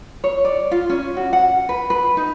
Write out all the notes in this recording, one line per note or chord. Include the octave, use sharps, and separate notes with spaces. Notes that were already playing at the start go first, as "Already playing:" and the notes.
C#5
D5
F4
C#4
F#4
F#5
B4
B4
D#4